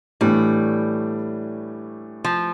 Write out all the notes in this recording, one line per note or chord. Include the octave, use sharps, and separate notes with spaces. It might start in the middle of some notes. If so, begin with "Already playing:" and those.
A2 E3 G3 A3 D4 G4
F3